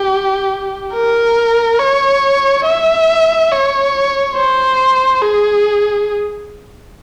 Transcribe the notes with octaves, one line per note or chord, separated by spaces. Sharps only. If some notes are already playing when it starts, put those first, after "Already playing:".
Already playing: G4
A#4
C#5
E5
C#5
C5
G#4